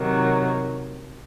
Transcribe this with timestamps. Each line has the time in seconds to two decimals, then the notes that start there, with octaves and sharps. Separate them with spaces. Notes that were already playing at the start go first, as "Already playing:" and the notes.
Already playing: C3 D#3 F#3